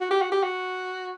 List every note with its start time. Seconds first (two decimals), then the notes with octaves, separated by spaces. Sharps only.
0.01 F#4
0.11 G4
0.21 F#4
0.32 G4
0.43 F#4